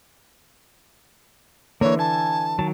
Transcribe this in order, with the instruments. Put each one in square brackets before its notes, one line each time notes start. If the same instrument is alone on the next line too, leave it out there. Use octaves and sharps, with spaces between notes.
[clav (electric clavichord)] D3 E3 [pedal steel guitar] A#3 [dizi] C#5
[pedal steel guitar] G#5 [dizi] A5
[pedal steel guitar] D#3 F#3 [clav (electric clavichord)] A5